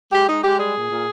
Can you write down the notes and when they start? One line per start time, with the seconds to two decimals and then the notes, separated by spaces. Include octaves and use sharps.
0.11 G#3 G4
0.28 G#3 D#4
0.43 G#3 G4
0.58 G3 G#4
0.75 A#2
0.90 A#2